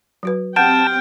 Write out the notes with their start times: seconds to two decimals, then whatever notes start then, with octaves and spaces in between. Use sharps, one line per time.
0.23 F#3 F#4 B4
0.56 C4 G4 F#5 G5 A5 F6 G6 D7